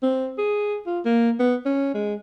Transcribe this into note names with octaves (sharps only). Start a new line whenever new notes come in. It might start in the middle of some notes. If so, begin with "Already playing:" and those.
C4
G#4
F4
A#3
B3
C#4
G#3